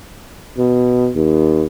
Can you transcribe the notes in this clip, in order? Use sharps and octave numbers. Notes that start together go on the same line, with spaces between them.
B2
D#2